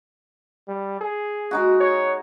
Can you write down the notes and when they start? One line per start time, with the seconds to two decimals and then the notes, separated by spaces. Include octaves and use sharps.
0.68 G3
1.01 G#4
1.51 G#3 D#4 F#4
1.80 C#5